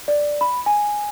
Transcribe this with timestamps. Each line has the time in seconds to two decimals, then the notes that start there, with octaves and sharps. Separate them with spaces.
0.08 D5
0.41 B5
0.66 G#5